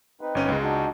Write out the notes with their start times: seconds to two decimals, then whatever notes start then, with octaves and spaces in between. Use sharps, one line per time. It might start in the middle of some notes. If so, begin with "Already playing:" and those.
0.21 C4 D#4 B4
0.35 G1 C#4 D#7
0.48 C#2 G#3
0.62 D4 D#4 F#4